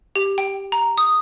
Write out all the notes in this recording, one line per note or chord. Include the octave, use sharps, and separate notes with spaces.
G4
G5
A#5
D#6